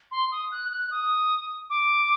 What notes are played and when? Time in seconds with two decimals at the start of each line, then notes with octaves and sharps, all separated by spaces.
0.11 C6
0.32 D#6
0.52 F#6
0.71 F#6
0.91 D#6
1.70 D6